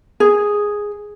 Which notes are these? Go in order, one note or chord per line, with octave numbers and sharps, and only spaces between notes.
G#4